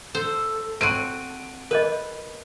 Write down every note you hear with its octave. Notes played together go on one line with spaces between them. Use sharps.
A4 C5
C4 F#4 D7 D#7
A#4 B4 C#5 D#5